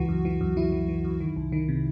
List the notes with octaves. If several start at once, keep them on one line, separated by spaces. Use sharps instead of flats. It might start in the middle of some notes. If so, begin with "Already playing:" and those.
Already playing: C#2 E3 F#4
F#2
E3
F#2
E3 E4
E3
E3
F#2
D#3
C2
D#3
C3